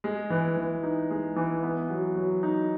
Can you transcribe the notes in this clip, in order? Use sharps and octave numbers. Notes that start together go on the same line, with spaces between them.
G#3
E3
E3
D#4
G#3
E3
B3
F#3
F#3
D#4